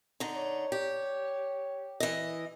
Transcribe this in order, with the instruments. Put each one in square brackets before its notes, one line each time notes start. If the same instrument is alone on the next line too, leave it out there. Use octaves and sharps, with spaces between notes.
[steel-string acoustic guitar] D3 D#4
[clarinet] C#5
[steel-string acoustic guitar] G4
E3 D#5